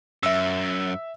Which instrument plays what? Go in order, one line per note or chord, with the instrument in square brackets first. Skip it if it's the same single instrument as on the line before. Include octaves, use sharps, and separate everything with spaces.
[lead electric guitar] F#2 [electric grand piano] E5 E6